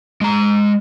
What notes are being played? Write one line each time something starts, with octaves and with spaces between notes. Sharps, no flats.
G#3 A#5